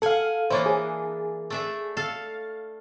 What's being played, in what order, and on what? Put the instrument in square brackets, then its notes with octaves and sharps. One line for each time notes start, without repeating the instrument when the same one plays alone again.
[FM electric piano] A4 F5 [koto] F#5 G#5
[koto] E3 A#3 D4 [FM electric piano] C5 C#5
[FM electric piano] G#4
[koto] A3 D4 E5
A4 F5